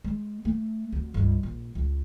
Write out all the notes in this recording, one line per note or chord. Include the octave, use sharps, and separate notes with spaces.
G#3
A3
F1 D2
C#2 G2
A#1
C#2